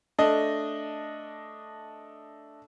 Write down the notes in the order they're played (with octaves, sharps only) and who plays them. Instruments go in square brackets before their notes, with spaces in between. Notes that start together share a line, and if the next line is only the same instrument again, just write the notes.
[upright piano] A3 D4 D#5